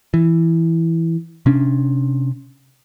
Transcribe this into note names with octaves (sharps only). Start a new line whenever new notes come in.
E3
C3 C#4 D4